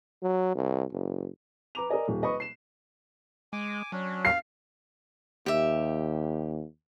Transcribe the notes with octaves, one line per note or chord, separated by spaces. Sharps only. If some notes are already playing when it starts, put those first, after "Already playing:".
F#3
C2
F#1
B4 A#5 D6 F7
A#4 D5 D#5 G#5
D#1
B4 D#5 B5 C#6
C7 E7
G#3 G#5 D6
F#3 C#4 D4
F5 C7
D#2 G4 E5